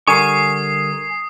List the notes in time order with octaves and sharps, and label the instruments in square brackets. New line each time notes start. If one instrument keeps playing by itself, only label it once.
[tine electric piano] D3 G3 A#4 [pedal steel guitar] G#5 C#6 [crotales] D#6 C7